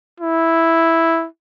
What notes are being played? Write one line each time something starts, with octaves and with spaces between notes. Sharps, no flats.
E4